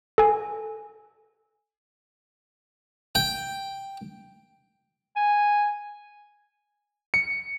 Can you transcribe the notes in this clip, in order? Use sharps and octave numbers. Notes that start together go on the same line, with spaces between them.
A4 G#5
G5
G#5
C#7